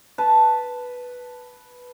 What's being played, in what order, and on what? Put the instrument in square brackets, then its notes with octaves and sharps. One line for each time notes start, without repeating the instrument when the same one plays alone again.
[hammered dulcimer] B4 A5